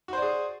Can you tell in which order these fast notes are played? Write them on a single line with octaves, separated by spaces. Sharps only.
F#4 C5 D5 G#4